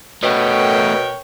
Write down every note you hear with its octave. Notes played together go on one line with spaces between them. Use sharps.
B2 A3 B3 A#4 B4 C#5 G5